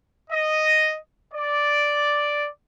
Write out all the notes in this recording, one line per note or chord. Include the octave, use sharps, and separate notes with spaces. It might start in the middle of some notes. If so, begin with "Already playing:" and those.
D#5
D5